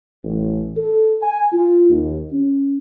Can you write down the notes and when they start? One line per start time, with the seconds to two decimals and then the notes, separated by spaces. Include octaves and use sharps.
0.24 A1
0.77 A4
1.23 G#5
1.53 F4
1.90 D#2
2.33 C#4